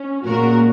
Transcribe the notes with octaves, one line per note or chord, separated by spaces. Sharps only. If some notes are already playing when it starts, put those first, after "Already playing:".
Already playing: C#4
A#2 G#3 C#4 F#4 A#4